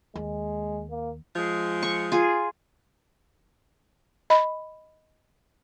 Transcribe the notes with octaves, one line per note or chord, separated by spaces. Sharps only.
D#2 G#3
A#3
F3 G#3
C#6
F4 G#4
D#5 B5